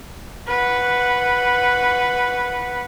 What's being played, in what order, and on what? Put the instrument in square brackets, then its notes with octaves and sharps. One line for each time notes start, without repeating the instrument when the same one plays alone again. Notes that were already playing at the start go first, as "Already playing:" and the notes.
[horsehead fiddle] B4 F#5